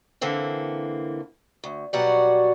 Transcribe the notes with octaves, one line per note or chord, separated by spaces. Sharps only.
D3 E3 A#3 C4
D2
B2 F#3 G3 F#4 D5 F#5